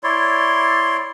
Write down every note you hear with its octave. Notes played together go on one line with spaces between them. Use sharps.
E4 C#5 D5 C6